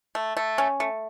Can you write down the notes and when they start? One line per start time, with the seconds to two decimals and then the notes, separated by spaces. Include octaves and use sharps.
0.15 A3
0.37 A3
0.58 C#4
0.80 A3